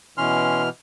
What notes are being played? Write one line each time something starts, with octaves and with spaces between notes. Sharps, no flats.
B2 E3 C#4 C6 F6